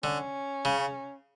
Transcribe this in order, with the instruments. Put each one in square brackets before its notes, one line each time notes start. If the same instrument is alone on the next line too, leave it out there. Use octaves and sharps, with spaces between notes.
[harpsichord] D3 [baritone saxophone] C#4
[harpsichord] C#3